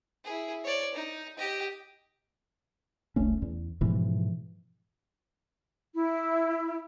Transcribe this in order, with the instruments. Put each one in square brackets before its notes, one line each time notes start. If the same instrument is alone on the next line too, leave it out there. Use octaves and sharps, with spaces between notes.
[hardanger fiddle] E4 G#4
C#5 D5
D#4
G4 D#5
[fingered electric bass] E1 C2 A3 C#4
E2
G#2 B2 E3 F3
[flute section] E4